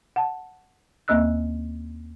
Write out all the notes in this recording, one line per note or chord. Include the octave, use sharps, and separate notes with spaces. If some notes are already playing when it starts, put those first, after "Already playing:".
F#5 A5
D#2 A#3 C4 D#5 E6 F#6